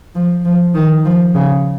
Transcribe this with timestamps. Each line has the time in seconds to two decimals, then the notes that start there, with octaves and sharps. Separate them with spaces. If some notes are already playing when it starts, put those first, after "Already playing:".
0.15 F3
0.45 F3
0.75 D#3
1.05 F3
1.34 C#3